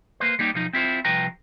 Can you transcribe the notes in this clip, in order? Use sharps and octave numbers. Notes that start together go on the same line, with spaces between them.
A#3 B4 C5
G3 A#3 D#4 G4
B1 F3 D#4
C4 E4 F4 C5
C2 F3 B4 G5 A#5